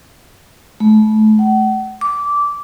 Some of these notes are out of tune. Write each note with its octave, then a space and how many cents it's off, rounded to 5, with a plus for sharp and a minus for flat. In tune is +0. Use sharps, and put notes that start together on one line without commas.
A3 -30
F#5 +40
D6 -15